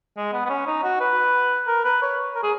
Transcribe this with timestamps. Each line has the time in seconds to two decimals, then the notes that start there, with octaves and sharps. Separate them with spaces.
0.17 G#3
0.33 B3
0.45 B3
0.49 C#4
0.67 D#4
0.83 F#4
1.00 B4
1.67 A#4
1.85 B4
2.02 C#5
2.35 A#4
2.43 G#4